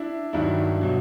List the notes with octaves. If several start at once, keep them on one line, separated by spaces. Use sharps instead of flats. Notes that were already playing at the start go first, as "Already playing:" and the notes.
Already playing: D4 E4
G2 D#3 F#3 D4 E4
B2 F#3